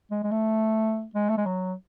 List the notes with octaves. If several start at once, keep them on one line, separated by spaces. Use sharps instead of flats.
G#3
G#3
A3
G#3
A3
G#3
F#3